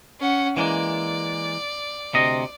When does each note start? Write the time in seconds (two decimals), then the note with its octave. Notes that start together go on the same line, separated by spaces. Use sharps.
0.19 C#4 F#5
0.57 E3 G#3 A#3 D5
2.13 D2 C3 D#5